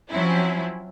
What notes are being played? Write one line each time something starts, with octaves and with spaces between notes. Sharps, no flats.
F3 F#3 C4 C#4 E4